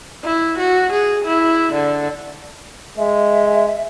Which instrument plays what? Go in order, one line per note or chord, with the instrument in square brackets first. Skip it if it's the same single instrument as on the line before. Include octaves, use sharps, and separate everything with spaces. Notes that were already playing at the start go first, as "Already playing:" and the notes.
[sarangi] E4
F#4
G#4
E4
D3
[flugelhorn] G#3 [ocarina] E5